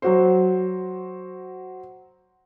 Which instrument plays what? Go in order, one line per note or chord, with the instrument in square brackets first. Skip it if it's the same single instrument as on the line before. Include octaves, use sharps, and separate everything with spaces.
[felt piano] F#3 F#4 C5